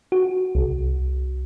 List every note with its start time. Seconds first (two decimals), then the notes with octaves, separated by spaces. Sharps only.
0.12 F#4
0.55 C2